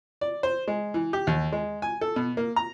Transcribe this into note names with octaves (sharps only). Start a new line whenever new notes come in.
D5
C5
G#3
E3
G4
D#2
G#3
G#5
A4
B2
A#3
A#5